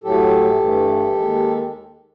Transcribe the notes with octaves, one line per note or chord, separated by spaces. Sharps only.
A2 F#3 A3 G4 A4
G2 E3 A3
D#2 D#3 G#3